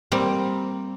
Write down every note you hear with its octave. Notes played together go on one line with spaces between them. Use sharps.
G3 A#3 C4